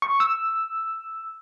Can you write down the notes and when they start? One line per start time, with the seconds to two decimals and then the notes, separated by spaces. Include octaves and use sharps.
0.02 C#6
0.20 E6